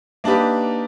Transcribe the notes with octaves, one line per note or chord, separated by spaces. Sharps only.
A#3 D4 D#4 G4 B4